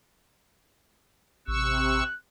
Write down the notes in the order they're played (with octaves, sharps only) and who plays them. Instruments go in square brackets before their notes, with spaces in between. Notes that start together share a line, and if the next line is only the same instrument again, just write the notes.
[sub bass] A1 [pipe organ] C3 C#6 E6 [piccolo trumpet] F#6